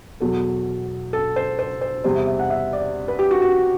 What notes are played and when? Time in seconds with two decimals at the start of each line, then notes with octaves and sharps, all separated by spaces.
0.20 E2 B2 F#3 A4
1.13 A4
1.36 C5
1.59 C5
1.81 C5
2.04 E2 C3 G3 C5
2.15 E5
2.27 E5
2.39 F#5
2.50 E5
2.73 D5
3.08 B4
3.19 G4
3.31 F#4
3.42 F#4